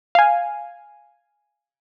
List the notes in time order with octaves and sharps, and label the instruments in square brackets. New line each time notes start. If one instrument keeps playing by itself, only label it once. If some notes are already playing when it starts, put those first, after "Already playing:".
[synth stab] F5 G#5